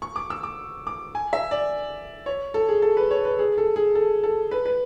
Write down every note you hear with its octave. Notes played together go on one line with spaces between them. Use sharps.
C#6
D6
E6
D6
D6
G#5
E5
D5
C#5
A4
G#4
A4
B4
C#5
B4
G#4
A4
G#4
A4
A4
B4
B4